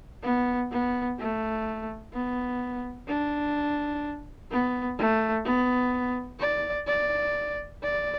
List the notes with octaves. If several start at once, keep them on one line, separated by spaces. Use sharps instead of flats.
B3
B3
A3
B3
D4
B3
A3
B3
D5
D5
D5